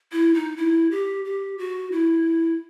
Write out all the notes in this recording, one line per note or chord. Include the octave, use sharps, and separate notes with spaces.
E4
D#4
E4
G4
G4
F#4
E4